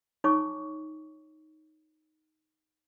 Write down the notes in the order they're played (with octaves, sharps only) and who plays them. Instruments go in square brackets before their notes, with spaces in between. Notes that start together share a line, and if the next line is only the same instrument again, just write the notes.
[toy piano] D#4 F4 C#5 G#5 C#6 D6